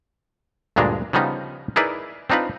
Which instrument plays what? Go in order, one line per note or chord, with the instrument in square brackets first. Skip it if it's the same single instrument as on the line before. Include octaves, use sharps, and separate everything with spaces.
[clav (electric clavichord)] D2 G2 A#2 G#3 D4 A#5
C#3 F3 G3 B3 D#4
D#4 E4 G#4 A#4 B4 D5
C4 D4 D#4 F4 B4